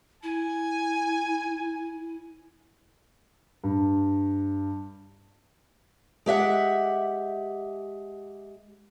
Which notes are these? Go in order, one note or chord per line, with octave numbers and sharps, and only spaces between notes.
E4 G#5
G2
G#3 G4 E5 F#5